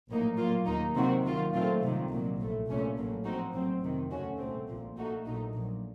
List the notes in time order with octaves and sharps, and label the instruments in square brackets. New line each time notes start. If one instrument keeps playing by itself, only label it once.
[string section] A#1 A2 F#3 A#3 D#4
A#2 F#3 A#3 F4
D#2 D#3 A#3 D#4
C3 D#3 F#3 C4 F#4
D#2 D#3 F#3 A#3 F4
A#2 F#3 A3 C4 F4
C2 C3 D#3
C2 A#2 F#3
A#1 A2 A3
C2 A#2 A3 C#4
A1 A2 F#3 A#3
A#2 F3 C4 D#4 F#4
A1 A2 F#3 C4
F2 C3 D#3
D#2 C#3 A3 C#4 F#4
C2 A#2 A3 C4
A#1 A#2 F3
A#2 A3 D#4 F#4
A#1 A#2 F#3 A3 D#4
A#1 A#2 F#3